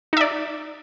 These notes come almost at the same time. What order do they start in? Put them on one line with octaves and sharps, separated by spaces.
D#4 E5 D5